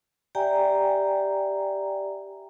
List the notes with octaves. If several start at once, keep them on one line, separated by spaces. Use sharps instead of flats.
G4 D5 E5 G5 G#5 A#5